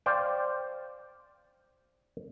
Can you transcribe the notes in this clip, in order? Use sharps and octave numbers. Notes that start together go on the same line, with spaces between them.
C5 D5 F5 G5